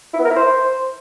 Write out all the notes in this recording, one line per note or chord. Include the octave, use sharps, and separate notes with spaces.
E4
B3
A#4
E4
C5